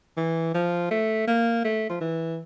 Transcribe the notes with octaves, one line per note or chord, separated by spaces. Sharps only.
E3
F3
A3
A#3
A3
F3
E3